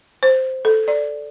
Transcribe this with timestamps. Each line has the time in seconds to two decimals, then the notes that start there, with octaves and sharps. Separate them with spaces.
0.23 C5
0.65 A4
0.88 D5